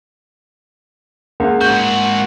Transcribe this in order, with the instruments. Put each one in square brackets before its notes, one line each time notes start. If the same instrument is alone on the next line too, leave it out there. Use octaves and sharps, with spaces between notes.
[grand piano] C#2 [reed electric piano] A#3 A#4 F#5
[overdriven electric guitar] G#2 F#4 [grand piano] G6